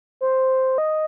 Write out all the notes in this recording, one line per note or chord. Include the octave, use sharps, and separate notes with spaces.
C5
D#5